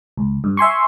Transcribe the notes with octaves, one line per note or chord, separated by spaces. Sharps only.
C#2
G2
E5 G#5 C6 C#6